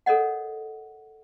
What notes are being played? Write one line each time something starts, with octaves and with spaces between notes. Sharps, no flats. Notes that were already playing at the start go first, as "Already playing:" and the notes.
A4 A#4 C#5 D#5 F#5